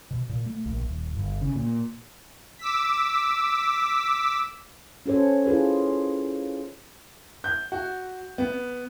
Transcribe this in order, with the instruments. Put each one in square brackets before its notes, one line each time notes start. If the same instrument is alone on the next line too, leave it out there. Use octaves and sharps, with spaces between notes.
[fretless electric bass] B2
A#2
A3
A#1
D#1
G1
C#3
A#2
[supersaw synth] D6 E6 B6
[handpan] C#4 F#4 A4 C5 C#5
E4 F4 G#4 B4
[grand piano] G6
F#4
B3